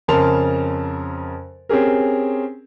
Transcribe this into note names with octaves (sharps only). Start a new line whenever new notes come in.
F2 C#3 A#4 A5 C6 F7
C4 C#4 G4 G#4 A#4